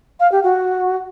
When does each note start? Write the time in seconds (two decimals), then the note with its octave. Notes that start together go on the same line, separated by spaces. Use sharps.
0.20 F5
0.32 G4
0.44 F#4